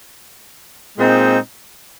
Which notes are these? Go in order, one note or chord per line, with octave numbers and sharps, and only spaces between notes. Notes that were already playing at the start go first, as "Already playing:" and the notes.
A#2 G#3 C4 D#4